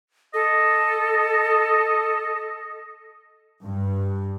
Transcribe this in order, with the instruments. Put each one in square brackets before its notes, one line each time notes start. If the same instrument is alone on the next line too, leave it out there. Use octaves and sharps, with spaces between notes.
[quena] A4 [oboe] D#5
[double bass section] G2